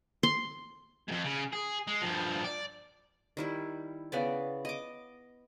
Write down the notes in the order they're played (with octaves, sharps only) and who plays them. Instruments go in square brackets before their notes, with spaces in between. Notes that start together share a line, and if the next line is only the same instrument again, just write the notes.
[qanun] C6
[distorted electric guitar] F2 G#2
C#3
G#4
G#3
G2 F3
D5
[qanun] D#3 G3 E4
C#3 B3 D5
D#5 D6